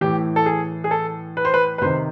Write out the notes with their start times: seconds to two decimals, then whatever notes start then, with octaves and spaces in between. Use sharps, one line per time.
0.01 A2 E3 G4
0.36 A4
0.46 G#4
0.84 G#4
0.91 A4
1.37 B4
1.45 C5
1.54 B4
1.78 B4
1.82 C3 D#3 C5